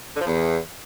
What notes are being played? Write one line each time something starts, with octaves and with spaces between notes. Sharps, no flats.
D3
F3
E2